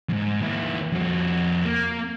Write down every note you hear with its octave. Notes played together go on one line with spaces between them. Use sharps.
F2 G#2
D#2 E4
F2 F#4
A#3